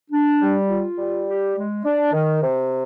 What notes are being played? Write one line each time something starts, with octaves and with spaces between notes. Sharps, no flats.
D4
G3
F4
G3
G4
G#3
D4
D#3
C3